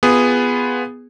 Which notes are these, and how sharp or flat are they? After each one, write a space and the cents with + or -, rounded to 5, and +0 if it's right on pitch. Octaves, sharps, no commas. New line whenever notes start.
B3 +0 F4 +0 G#4 -10